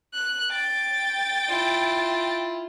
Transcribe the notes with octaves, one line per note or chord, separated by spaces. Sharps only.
F#6
G5 A6
E4 F4